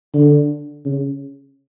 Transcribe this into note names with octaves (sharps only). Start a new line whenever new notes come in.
D3
C#3